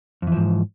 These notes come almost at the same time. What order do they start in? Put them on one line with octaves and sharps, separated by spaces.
F2 E3 F3 G#2